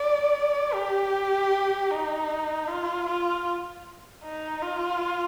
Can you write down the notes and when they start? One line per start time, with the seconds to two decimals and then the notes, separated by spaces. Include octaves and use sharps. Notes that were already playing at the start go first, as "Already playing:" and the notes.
Already playing: D5
0.74 G4
1.92 D#4
2.68 F4
3.07 F4
4.24 D#4
4.63 F4